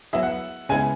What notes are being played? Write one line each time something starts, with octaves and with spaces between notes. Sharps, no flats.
F#3 B3 E4 G#4 E5
F#5
C#3 G#3 B3 E4 G#5